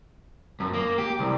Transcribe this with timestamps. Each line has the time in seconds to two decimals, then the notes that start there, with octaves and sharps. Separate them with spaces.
0.60 F#2
0.74 A#3
0.98 G4
1.19 C2